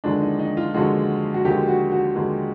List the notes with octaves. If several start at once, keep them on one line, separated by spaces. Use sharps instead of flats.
D#2 D3 F3 G#3 D4
D#4
D#4
F4
D#2 D3 F3 G#3 F#4
F#4
D#2 D3 F3 G#3 G4
F#4
F#4
D#2 D3 F3 G#3